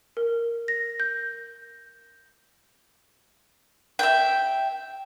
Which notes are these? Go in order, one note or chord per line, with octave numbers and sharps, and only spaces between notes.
A#4
A#6
G6
E5 G5